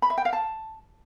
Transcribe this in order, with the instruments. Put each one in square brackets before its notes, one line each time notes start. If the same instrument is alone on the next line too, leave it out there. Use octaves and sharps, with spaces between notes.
[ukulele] B5
E5
G5
F5
A5